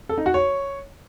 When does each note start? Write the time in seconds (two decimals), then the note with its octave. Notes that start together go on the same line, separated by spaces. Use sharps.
0.09 A4
0.18 D#4
0.26 F#4
0.34 C#5